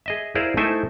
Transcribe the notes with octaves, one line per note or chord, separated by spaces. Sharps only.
G#4 D#5 E5
E4 G#4 A#4 C5 D5 F5
A3 D#4 E4 A4 C5 G#5